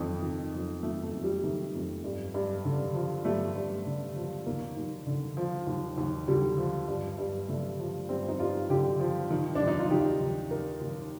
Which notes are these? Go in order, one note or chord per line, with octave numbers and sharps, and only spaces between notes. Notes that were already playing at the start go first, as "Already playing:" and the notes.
Already playing: F2 D#3
D#3
F2
D#3 A3
A3
F2
G3
D#3 A3
F2
G2
G2
D3
F3
G2 A3
G2
D3
F3
D#2 A#3
D#2
D3
F3
D#2
D#2
D3 G3
F3
G2
G2
D3 A3
F3
G2 C4
D#4
G2 F4
D3 G4
F3
D#3
D#2 D4
D#4
F4
D#3 G4
D#2
D#3 A#4
D#2